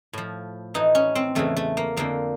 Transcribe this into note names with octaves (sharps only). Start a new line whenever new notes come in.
A2 F3
A2 E3 D#4
C#4
C4
E2 C#3 E3 A3
A3
A#3
F2 D3 F3 A#3